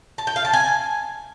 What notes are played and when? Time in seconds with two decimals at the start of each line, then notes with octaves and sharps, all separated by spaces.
0.18 A5
0.27 G5
0.36 F5
0.45 A5
0.53 G#5